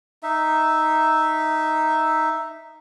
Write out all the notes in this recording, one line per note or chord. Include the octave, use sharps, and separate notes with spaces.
D#4 E5